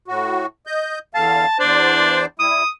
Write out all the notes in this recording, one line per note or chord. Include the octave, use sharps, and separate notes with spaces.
A2 F#4
D#5 G6
E2 D3 F5 A5
E2 D4 C5 D5
G3 E4 D#6